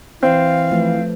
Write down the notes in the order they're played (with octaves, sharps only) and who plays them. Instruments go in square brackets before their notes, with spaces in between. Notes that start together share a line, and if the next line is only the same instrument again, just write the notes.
[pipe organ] E3 [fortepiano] C4 [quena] F5
[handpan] F3 A3 B4